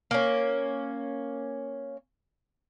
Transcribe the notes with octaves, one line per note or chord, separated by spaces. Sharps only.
A#3 C#4